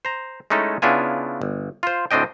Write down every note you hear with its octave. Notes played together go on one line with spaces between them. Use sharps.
C5 A#5
G#3 A3 C#4 D#4 E4 A4
C#3 B3 D4 E4 F4 G#5
G1
F4 C5
D2 A2 C4 D4 D#5 G5